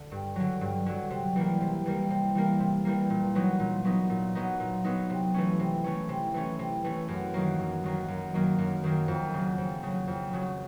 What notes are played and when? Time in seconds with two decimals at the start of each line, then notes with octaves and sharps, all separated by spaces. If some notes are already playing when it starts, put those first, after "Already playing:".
Already playing: D3
0.12 G2
0.36 D3 F#3
0.61 G2
0.86 D3 F#3
1.10 C3
1.36 E3 G3 A#3
1.61 C3
1.86 E3 G3 A#3
2.10 C3
2.35 E3 G3 A#3
2.60 C3
2.85 E3 G3 A#3
3.10 A#2
3.35 F#3 B3 D#4
3.60 A#2
3.85 F#3 B3 D#4
4.10 A#2
4.35 F#3 B3 D#4
4.60 A#2
4.84 F#3 B3 D#4
5.10 C3
5.34 E3 A3 C#4
5.59 C3
5.84 E3 A3 C#4
6.09 C3
6.34 E3 A3 C#4
6.59 C3
6.84 E3 A3 C#4
7.08 F#2
7.34 D#3 F#3 A#3
7.59 F#2
7.84 D#3 F#3 A#3
8.08 F#2
8.34 D#3 F#3 A#3
8.58 F#2
8.84 D#3 F#3 A#3
9.08 F2
9.34 C#3 F#3
9.58 F2
9.83 C#3 F#3
10.07 F2
10.33 C#3 F#3